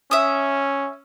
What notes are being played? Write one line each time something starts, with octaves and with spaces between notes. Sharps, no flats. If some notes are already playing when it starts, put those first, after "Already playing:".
C#4 E5 D#6